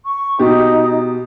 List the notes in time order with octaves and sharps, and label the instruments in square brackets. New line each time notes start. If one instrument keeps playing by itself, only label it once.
[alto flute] C#6
[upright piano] B2 G4 [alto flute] D#4